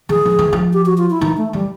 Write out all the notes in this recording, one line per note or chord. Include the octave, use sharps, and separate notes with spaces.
E3 G#4
F3
E3
F3
G4
F#4
F4
E4
E3 D#4
A3
E3 G3